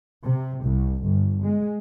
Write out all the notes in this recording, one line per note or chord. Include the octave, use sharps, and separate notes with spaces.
C3
C2
G1
G#3